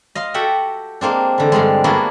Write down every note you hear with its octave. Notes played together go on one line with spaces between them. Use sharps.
D#5 F5 C6
F#4 G4 A4 E5 F#5 G5
G#3 A#3 C4 D4
D3 E3
G2 D3 G3 G#3
A#3 B3 D4 E4 F#4 G#4